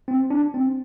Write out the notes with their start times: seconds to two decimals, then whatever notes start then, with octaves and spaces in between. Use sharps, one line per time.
0.08 C4
0.30 D4
0.54 C4